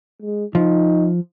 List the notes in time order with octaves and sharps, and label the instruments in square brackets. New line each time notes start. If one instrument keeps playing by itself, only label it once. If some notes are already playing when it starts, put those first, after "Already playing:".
[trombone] G#3
[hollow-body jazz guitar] F3 [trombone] D#4